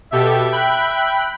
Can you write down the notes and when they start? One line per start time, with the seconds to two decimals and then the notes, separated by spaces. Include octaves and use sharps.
0.12 B2 G4 A4 E5
0.52 G5 B5 F#6